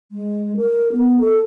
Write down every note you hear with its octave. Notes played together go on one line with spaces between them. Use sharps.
G#3
A#4
B3
A4